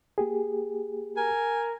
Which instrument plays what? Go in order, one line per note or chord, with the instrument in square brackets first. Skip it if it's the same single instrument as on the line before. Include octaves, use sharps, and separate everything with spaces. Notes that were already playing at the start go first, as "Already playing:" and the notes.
[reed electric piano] A#3 G4 G#4
[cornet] A#4 [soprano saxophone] G#5